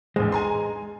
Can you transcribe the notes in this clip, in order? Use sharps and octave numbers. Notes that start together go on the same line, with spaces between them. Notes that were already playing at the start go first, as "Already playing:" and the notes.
A#1 E2 G#3 C5
G#5 A#5 C6